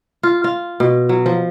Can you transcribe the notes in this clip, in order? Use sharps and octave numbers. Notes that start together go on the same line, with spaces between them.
F4
F4
B2
F#3
F3